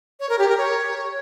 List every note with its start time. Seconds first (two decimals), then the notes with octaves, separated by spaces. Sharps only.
0.20 C#5
0.29 A#4
0.39 G4
0.48 A#4
0.58 C#5